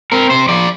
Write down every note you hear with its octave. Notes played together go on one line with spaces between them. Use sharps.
C4 A#4
C3 C5
F3 D5